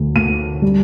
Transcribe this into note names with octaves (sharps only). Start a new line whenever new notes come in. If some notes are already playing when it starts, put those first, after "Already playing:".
Already playing: D2 D3
D2 D#7
G3